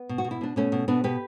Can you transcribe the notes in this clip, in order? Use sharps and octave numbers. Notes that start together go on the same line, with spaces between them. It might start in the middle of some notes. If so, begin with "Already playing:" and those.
Already playing: B3
B2
F#4
B2
E4
B2 D4
B2 A3 C#4
B2
B2 B3 D4
B2 G4 B4